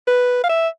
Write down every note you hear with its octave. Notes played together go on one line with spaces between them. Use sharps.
B4
F5
E5